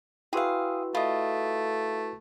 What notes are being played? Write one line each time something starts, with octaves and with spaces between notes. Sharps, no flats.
E4 F#4 G#4 B4 F5 G5 C6 E6
A3 F4 D#5 E5 B5